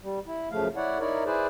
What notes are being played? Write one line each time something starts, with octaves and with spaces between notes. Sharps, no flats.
G3
E4
F#2 C#3 F3 A3 F5
E4 C#5 D5 F#5
D#4 E4 A#4 C#5 D5
E4 G#4 B4 C5 D5